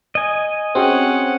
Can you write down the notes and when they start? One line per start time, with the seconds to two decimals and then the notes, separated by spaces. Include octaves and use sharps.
0.15 D#5 G#5
0.75 C4 C#4 F#4 G#4 F#5 G5